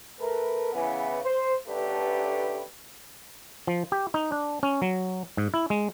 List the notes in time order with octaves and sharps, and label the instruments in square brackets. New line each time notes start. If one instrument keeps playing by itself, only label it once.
[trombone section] A3 A#4 B4
C#3 E3 B3
C5
A1 D3 A3 D4 G4 B4
[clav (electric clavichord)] F3
G4
D#4
D4
C#4
F#3
G#2
E4
G#3